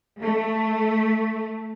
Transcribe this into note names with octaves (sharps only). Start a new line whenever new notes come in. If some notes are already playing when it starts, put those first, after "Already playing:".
A3